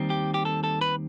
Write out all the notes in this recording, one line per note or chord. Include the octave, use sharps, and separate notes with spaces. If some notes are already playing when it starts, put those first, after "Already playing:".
Already playing: D#2 D#3 G3 C4
G4
G4
A4
A4
B4